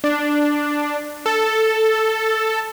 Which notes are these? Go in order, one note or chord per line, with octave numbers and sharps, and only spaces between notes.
D4
A4